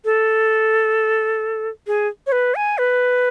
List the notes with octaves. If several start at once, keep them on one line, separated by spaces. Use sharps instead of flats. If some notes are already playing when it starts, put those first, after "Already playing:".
A4
G#4
C#5
B4
G#5
B4